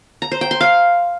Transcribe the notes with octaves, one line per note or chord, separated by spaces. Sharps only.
A#5
C5
G5
C6
F5